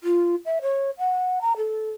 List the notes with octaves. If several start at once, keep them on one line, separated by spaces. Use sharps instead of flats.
F4
E5
C#5
F#5
A#5
A4